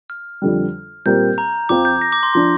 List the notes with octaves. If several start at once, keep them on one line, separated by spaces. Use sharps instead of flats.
F6
F2 D3 G3
A#2 G3 C4 G4 A#4 G6
A#5
F2 F3 C4 F4 C5 D6
G6
A#6
D6
C6
F3 D4 C6